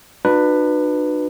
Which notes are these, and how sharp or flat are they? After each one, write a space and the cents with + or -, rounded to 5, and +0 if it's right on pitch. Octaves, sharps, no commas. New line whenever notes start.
D4 +40 F#4 -35 B4 +0